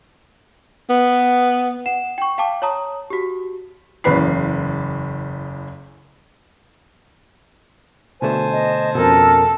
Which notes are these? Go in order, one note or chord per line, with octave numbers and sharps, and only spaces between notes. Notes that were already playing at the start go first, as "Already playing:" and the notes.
B3
F#5 E7
G5 C#6
F5 G5 A5 D6
C#5 A5 A#5 D#6
F#4 G4
F#1 E2 C#3 B4 B5 C7
B2 D3 A3 C5 G#5 A5
D#5
F2 B2 C#4 A4 A#4 E6